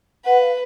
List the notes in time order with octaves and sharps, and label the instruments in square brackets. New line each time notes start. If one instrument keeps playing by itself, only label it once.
[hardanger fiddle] B4 [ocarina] F#5
[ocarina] F5